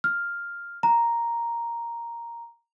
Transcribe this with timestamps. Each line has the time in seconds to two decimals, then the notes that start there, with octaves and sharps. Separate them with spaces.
0.04 F6
0.83 A#5